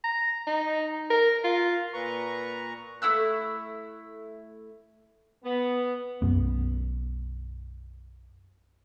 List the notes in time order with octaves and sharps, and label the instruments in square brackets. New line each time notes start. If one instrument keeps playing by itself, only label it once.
[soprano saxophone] A#5
D#4
A#4
F4
[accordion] A#2 A#5 C#6 [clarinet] B4
[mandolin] A3 E4 E6 F#6
[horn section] B3
[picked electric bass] B1 F#2 B3